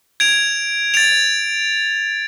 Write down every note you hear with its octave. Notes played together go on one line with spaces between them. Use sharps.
G#6 D7 F7
A6 D7 F7